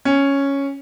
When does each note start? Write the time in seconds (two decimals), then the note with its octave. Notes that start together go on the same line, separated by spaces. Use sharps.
0.05 C#4